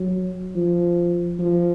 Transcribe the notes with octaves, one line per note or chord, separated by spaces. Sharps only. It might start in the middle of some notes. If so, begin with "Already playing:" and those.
Already playing: F#3
F3
F3